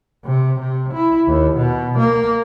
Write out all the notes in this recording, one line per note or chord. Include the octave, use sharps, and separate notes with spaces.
C3
C3
E4
D#2
B2
A#3